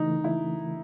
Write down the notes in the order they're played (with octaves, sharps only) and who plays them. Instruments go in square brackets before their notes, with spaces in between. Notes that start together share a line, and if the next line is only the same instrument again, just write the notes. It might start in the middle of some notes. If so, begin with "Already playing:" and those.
Already playing: [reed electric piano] C#3 E3 A3 [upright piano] D#4
[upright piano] E4